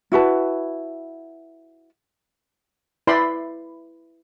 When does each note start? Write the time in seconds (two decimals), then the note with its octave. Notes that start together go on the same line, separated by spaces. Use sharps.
0.12 E4 F#4 B4 A5
3.07 E4 B4 D5 G5 B5 C6